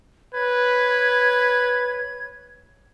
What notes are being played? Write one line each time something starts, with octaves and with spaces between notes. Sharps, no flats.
B4 C#5 G#6